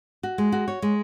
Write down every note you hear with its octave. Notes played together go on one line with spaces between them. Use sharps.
F#4
G#3
F#4
C#5
G#3